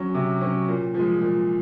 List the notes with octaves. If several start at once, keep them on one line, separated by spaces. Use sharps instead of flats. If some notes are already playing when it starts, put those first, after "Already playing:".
Already playing: F#3 C#4
C3
F#3 C#4
A#2
F3 G#3
A#2